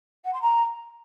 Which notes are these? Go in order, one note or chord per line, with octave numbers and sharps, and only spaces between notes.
F#5
C6
A#5